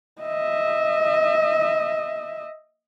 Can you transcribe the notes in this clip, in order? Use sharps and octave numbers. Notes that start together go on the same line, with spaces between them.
D#5 E5